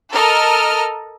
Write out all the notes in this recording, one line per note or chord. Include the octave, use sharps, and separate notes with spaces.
A4 A#4 D#5 F6